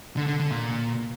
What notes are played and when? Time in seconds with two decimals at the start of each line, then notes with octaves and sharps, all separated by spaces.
0.17 D3
0.27 D3
0.39 D3
0.51 A#2